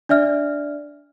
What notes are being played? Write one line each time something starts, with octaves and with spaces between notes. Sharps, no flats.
D4 D5 E5 F6